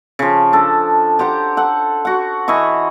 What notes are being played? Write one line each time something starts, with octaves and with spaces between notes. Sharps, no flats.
C#3 F3
D4 A4
G4 C5 F#5 A#5
A4 F#5
F#4 F#5
E3 E4 D#5 C#6